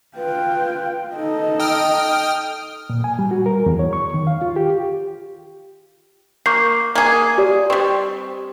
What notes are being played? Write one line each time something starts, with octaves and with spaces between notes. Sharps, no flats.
F4 B4 G5
D#4 A4 D#5
G5 D#6 F6
A#2
G#5
G3
F#4
A#4
E2
C#5
C#6
D#3
F5
F4
G4
A#3 C#6 G6 C7
A#3 G#4
G4 D5
G3 C4 C#6